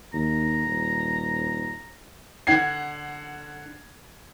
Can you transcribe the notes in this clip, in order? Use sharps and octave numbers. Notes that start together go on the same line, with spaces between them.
D#2 A#5
D#1
D3 F#5 G#6 C7